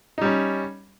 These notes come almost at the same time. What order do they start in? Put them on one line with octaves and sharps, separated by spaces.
D#4 G3 C#4